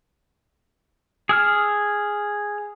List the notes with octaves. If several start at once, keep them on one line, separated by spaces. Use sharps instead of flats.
G#4 E6 F6